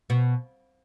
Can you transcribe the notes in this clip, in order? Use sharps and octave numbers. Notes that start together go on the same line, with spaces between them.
B2